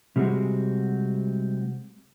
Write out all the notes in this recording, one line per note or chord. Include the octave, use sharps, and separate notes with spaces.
C3 G3 G#3 C4 F#4